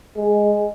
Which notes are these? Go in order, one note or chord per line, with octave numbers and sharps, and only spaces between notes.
G#3